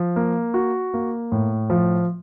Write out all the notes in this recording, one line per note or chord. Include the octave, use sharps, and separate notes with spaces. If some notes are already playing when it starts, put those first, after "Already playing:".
Already playing: F3
A#3
F#4
A#3
A2
F3